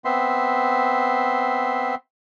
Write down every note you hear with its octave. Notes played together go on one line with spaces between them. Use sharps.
B3 C4 E5 C6